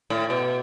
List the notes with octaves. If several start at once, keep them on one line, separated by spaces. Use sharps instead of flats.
A2
B2